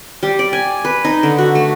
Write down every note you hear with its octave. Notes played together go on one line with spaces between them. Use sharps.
G3
D5
G#5
B4
D#4
D3
F#4
A3